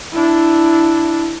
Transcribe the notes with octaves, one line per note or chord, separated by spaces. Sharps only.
D4 E4